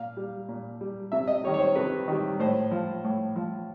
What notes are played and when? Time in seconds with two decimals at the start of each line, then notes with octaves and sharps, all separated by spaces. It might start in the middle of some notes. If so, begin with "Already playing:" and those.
Already playing: A#2 F5
0.17 G3
0.49 A#2
0.81 G3
1.12 C3 E5
1.27 D#5
1.43 D#3 G3 C#5
1.54 C#5
1.60 C5
1.75 C3 B4
2.08 D#3 G3
2.40 A2 C5
2.72 F3
3.04 A2
3.36 F3